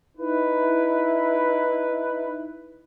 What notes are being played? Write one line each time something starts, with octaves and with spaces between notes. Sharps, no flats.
D#4 E4 B4